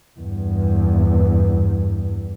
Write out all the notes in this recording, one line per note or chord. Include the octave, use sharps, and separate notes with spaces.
E2 G2